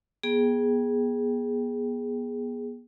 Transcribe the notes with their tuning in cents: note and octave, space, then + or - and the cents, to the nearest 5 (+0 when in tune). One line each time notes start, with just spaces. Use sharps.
B3 -30 G#4 +0 G5 +0